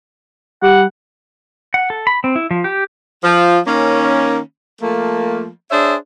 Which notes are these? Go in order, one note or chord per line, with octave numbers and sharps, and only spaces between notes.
G3 F#5
F#5
A4
B5
C4
E4
F3
G4
F3
D#3 A#3 C#4
F3 A3 A#3
D4 G#4 C5 C#5 E5